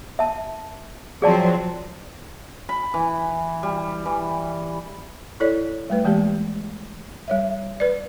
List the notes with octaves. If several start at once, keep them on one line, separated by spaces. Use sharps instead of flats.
E5 A5
F3 F#3 C4 G#4 D5 A5
B5
E3
G3
E3
E4 A4 C#5 D5
G3 A3 B4
E3 G#3 A#3 G4
G3 C#5 E5
B4 D5